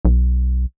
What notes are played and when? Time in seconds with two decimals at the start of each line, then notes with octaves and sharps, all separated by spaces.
0.05 B1